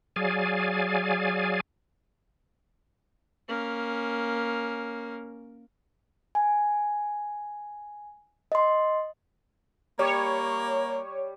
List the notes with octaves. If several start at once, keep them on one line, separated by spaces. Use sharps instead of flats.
F#3 G#4 D5 F5 G#5
A#3 C#4
G#5
D#5 C6
G3 A#3 C#5